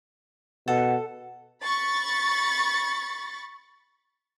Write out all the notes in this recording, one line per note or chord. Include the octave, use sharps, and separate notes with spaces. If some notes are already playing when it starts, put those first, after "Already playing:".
B2 A4 F#5
B5 C#6 A6